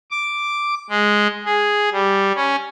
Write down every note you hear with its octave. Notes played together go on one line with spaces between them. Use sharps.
D6
G#3
G#4
G3
C#4